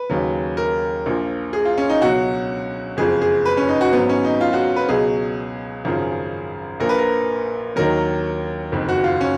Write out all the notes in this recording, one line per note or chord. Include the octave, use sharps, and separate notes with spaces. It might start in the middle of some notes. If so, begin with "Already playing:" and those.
Already playing: B4
D#2 C#3 F#3
A#4
A#1 A#2 F3
G#4
F4
C#4
D#4
C#2 B2 F#3 F#4
F#1 F2 F3 G#4
G#4
B4
C#4
D#4
F#4
G#1 G#2 F#3 B3
C#4
D#4
F4
F#4
B4
C#2 B2 F#3 G#4
G#1 F#2 C#3 F3
A#1 A#2 F3 A#4
B4
A#4
D#2 D#3 F#3 A#4
F#1 F2 D#3
F#4
F4
C#4